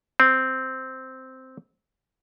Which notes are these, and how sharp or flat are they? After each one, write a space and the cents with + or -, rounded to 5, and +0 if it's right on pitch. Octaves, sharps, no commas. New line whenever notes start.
C4 -5